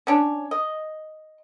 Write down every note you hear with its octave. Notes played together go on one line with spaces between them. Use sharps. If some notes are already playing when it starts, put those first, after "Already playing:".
C#4 D4 C#5
D#5